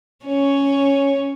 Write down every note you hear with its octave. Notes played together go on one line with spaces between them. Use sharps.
C#4 C#5